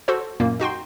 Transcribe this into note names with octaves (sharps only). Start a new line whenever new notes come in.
F#4 A4 C5
F#2 A#2 A#3
D#4 F#4 G5 C6